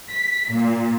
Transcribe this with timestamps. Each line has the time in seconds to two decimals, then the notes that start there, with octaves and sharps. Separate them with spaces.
0.10 B6
0.52 A#2